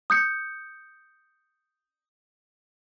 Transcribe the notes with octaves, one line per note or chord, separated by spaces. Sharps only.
D#6 G6 C#7